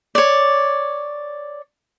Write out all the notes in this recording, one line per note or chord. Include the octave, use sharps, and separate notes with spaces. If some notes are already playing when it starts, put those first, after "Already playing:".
C#5 D5